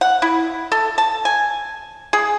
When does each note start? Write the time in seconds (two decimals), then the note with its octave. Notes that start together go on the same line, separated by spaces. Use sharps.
0.01 F#5
0.22 E4
0.72 A4
0.98 A5
1.25 G#5
2.13 G#4